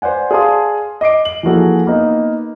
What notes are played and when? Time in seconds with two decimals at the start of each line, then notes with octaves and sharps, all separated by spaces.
0.02 B4 C5 D5 F#5 G#5
0.31 G#4 D5 F5 A5 C6 D#6
1.01 D#5 D6 C7 D7
1.25 F#7
1.43 E3 F3 A#3 F#4 G#4 A4
1.87 A#3 B3 D#4